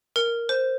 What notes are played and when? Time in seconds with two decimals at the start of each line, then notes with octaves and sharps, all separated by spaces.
0.16 A#4
0.49 C5